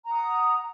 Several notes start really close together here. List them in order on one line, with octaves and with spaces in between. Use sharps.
A#5 F#5 D#6